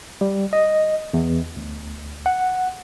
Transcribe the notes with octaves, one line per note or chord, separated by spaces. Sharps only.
G3
D#5
E2
D2
F#5